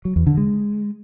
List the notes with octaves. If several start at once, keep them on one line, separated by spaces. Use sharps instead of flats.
F#3
E2
D3
G#3